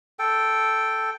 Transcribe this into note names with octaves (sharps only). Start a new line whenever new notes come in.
A4 G5